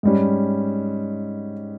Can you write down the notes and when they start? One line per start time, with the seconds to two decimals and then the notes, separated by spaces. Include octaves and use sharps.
0.03 G#2 G3 C#4